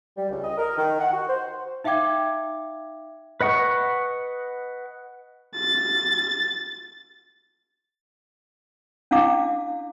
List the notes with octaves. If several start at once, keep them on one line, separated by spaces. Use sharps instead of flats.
G3
C#2
D#5
A#4
D#3
F#5
F#4
C5
D#4 E5 F5 G5 D6 G#6
B4 D#5 F#5 C#6
A6
C#4 D4 E4 F5 D6